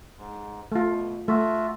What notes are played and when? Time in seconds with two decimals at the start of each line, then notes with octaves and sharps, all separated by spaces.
0.18 G#2
0.72 A3 F4
0.88 B2
1.28 A3 F4 F#4 E5